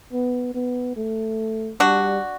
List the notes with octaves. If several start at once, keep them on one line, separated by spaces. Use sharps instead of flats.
B3
B3
A3
G3 D4 F#4